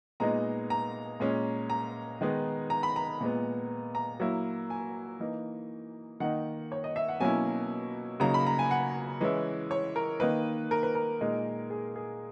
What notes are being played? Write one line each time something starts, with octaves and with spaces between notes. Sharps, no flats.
A#2 G#3 B3 D#4 A#5
A#5
A#2 G#3 C#4
A#5
D#3 G#3 B3 D#4
A#5
B5
A#5
A#2 G#3 B3
A#5
F#3 A#3 E4
G#5
E3 A#3 D#4
D#3 A#3 D#4 F#5
C#5
D#5
E5
F#5
B2 F#3 A#3 C#4 E4 G#5
C#3 F#3 A#3 D#4 A#5
B5
A#5
G#5
F#5
E3 G#3 C#4 E4
C#5
A#4
D#3 A#3 D#4 B4
A#4
B4
A#4
A#2 G#3 D#4
G#4
G#4